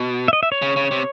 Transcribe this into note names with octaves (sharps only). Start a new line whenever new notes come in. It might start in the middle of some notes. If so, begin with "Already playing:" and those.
Already playing: B2
E5
D#5
E5
C#5
C#3
C#3
C3